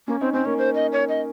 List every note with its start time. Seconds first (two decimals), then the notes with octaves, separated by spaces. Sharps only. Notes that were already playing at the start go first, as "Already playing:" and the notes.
0.07 A#3 C#4
0.21 C4 D#4
0.33 C4 C#4
0.45 A#3 C#4
0.58 C5
0.75 D#5
0.92 C#5
1.09 D#5